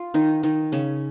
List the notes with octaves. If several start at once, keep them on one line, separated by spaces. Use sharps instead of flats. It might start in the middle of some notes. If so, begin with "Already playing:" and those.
Already playing: F4
D#3 D#4
D#3 D#4
C#3 C#4